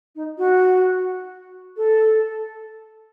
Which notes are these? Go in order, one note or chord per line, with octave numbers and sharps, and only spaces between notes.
D#4
F#4
A4